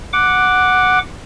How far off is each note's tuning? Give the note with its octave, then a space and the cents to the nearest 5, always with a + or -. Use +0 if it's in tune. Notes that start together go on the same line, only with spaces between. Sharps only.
F#5 +0 D6 +0